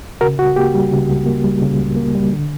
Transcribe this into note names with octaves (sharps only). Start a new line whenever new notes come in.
C#3 F#4 A#4
C#2 F#4
A#3 G4
G3
C#3
C#2
A#3
G3
C#3
C#2
A#3
G3
D3